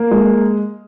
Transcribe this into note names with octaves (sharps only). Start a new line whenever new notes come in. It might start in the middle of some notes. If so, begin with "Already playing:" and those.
Already playing: A#3
G#3